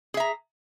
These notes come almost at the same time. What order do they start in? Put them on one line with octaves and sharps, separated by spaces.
G#4 E5 A#5